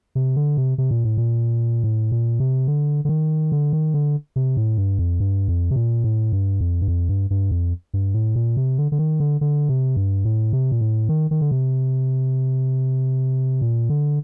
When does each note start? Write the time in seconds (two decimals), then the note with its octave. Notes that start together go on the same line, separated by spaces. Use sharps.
0.15 C3
0.36 D3
0.57 C3
0.78 C3
0.91 A#2
1.04 A2
1.17 A#2
1.84 A2
2.12 A#2
2.40 C3
2.67 D3
3.05 D3
3.09 D#3
3.52 D3
3.73 D#3
3.94 D3
4.36 C3
4.57 A2
4.78 G2
4.99 F2
5.20 G2
5.48 F2
5.71 C3
5.76 A#2
6.04 A2
6.33 G2
6.61 F2
6.81 G2
6.88 F2
7.09 G2
7.30 G2
7.51 F2
7.94 G2
8.14 A2
8.36 A#2
8.57 C3
8.78 D3
8.92 D3
8.99 D#3
9.20 D3
9.41 D3
9.69 C3
9.97 G2
10.25 A2
10.53 C3
10.72 A#2
10.81 A2
11.09 D#3
11.31 D#3
11.41 D3
11.51 C3
13.62 A#2
13.90 D3